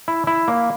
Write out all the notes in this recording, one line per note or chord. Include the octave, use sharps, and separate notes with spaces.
E4
E4
A#3